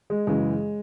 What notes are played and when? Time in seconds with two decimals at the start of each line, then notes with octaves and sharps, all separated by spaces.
0.10 G#3
0.27 F#2 C#3 E3 G#3